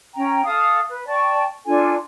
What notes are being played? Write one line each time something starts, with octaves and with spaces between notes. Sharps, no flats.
C#4 G5 A#5
A4 F5 D#6
B4
D5 G5 A5 C#6
D4 F4 A4 G#5